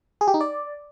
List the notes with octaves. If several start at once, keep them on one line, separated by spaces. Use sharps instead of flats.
G#4
G4
D#4
D5